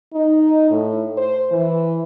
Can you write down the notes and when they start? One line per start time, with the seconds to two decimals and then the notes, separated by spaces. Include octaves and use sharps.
0.13 D#4
0.70 A2
1.17 C5
1.51 E3